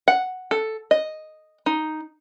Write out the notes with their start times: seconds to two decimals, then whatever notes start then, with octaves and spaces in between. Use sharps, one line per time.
0.08 F#5
0.51 A4
0.91 D#5
1.66 D#4